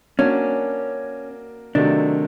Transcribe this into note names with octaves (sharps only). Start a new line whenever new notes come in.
A#3 C#4 D4 F#4
C3 D#3 F#3 A3 D4